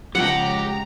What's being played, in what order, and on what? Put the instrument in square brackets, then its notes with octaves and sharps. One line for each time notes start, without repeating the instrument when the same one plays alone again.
[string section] C#3 G#3 A#5 [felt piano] F3 C#7 [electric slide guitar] G4 G5 [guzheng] F#5